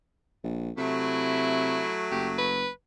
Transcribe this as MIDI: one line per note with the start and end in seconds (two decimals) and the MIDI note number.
0.44 0.71 34
0.78 1.87 48
0.78 2.66 54
0.78 2.66 57
0.78 1.99 64
2.11 2.67 30
2.11 2.28 67
2.38 2.70 71